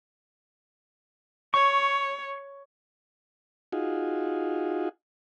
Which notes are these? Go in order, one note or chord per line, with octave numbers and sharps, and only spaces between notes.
C#5 C#6
D#4 F4 F#4 G#4